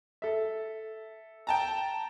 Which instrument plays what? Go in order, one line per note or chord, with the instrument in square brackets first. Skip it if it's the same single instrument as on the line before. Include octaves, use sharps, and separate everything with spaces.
[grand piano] A4 E5
[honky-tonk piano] G5 A5 A#5